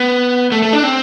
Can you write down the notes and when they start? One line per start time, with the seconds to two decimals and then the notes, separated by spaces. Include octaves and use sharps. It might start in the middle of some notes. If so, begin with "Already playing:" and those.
Already playing: B3
0.52 A3
0.62 A3
0.73 D4
0.83 C4